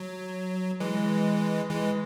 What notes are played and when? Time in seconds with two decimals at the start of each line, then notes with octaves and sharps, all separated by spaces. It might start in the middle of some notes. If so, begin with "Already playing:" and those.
Already playing: F#3
0.80 E3 G#3
1.70 E3 G#3